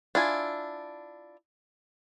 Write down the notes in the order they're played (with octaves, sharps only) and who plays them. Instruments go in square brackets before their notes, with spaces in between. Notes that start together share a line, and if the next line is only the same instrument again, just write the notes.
[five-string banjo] D4 E4 F4 G#5